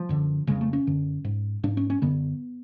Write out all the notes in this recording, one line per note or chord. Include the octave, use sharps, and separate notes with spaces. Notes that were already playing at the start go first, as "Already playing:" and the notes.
Already playing: F3
F#2 D3
F2 C#3 G#3
A3
C#4
F#2 D3
G#2
G#2 D4
C#4
C#4
F#2 D3 B3